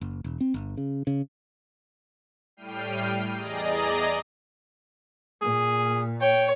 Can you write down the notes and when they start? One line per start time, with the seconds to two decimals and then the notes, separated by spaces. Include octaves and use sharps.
0.01 F#1
0.24 E1
0.41 C4
0.54 G1
0.77 C#3
1.07 C#3
2.57 A2 G3 G5 F6 C7 D#7
3.35 E2 G#4 D5 D#5 A#5
5.42 A#2 G#4
6.21 C#5 G5